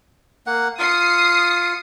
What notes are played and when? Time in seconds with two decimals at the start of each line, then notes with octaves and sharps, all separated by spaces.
0.47 A#3 F#5
0.79 F4 D#6 C7 C#7